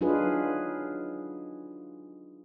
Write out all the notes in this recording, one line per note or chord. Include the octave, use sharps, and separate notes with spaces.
F#3 D4 D#4 F4 G#4 B4